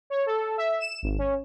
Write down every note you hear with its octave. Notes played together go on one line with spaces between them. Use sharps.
C#5
A4
E5
E7
G#1
C#4